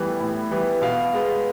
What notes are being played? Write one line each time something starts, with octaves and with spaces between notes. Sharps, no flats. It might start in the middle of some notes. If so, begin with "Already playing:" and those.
Already playing: A2 E3 G3 B3
A2
E3 G3 B3
B2 F5
G#3 B3